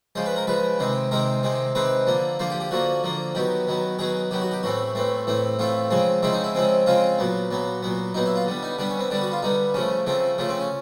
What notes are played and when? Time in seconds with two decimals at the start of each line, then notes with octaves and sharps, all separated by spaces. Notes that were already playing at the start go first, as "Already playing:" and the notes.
0.15 C#3 F3 G#3 C5
0.26 B4
0.36 A#4
0.47 C#3 F3 G#3 B4
0.79 C3 D#3 G#3 C4
1.11 C3 D#3 G#3 C4 A#4
1.43 C3 D#3 G#3 C4
1.75 C3 D#3 G#3 C4 B4
2.07 D3 F3 A#3
2.39 D3 F3 A#3 C5
2.50 G4
2.60 G4
2.71 D3 F3 A#3 F#4
3.03 D3 F3 A#3
3.35 D#3 F#3 B3 G4
3.67 D#3 F#3 B3
3.99 D#3 F#3 B3 G#4
4.31 D#3 F#3 B3 G4
4.41 F#4
4.51 G4
4.63 A2 E3 A3 C4 F#4
4.95 A2 E3 A3 C4
5.27 A2 E3 A3 C4
5.59 A2 E3 A3 C4 F4
5.90 C#3 F3 G#3 C4
6.23 C#3 F3 G#3 C4 E4
6.33 D#4
6.44 E4
6.55 C#3 F3 G#3 C4
6.86 C#3 F3 G#3 C4 F4
7.19 A#2 F#3 B3
7.51 A#2 F#3 B3
7.83 A#2 F#3 B3
8.14 A#2 F#3 B3 D#4
8.25 E4
8.36 F4
8.46 D3 G3 B3
8.63 D#4
8.78 D3 G3 B3 D4
8.90 C#4
8.99 C4
9.10 D3 G3 B3 D4
9.21 F#4
9.32 F4
9.42 D3 G3 B3 D#4
9.74 C#3 F3 A3 C#4
10.06 C#3 F3 A3 C4
10.38 C#3 F3 A3 C#4
10.49 C4
10.60 C#4